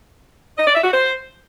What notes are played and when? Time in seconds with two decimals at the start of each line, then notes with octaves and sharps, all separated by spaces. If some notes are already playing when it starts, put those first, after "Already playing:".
0.58 D#5
0.66 D5
0.75 E5
0.83 F#4
0.92 C5